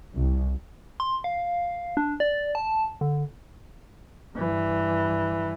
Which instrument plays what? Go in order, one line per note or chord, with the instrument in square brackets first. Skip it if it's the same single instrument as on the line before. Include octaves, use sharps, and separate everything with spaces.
[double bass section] C2
[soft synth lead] C6
F5
D4
D5
A5
D3
[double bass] G2 E3